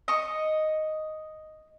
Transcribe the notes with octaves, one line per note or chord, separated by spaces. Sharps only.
D#5 C#6